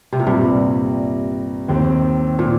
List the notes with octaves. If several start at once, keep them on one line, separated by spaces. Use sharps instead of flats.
C3
A#2
C2 G2 C3 G3
D#2 D#3 C4 G4
A#2